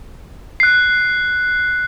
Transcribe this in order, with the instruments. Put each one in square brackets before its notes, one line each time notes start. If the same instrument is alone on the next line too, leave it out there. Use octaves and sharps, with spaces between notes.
[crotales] F#6 C7